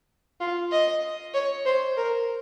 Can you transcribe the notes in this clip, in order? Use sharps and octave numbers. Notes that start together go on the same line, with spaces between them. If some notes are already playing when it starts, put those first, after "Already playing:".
F4
D#5
C#5
C5
A#4